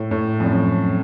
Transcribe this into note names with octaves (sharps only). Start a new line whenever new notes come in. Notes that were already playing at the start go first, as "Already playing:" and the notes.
Already playing: A2
A2
F2
F#2